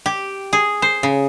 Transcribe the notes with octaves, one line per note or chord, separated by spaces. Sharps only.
G4
G#4
C5
C#3